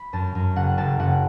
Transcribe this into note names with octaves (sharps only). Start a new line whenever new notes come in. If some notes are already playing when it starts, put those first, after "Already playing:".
Already playing: B5
F#2 A5
F#2
F#1 F#5
F#1 A5
F#1 F#5